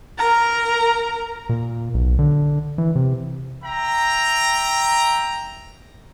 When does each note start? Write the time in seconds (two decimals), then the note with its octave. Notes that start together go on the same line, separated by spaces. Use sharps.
0.18 A#4 A#5
1.49 A#2
1.94 B1
2.19 D3
2.78 E3
2.95 C3
3.64 E5 G5 A#5